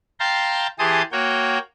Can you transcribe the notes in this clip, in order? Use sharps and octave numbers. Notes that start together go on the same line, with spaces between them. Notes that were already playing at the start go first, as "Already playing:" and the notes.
F5 G5 A5 A#5 C6
E3 G4 G#4 A5 C6 D#6
A#3 F#4 C#5 G5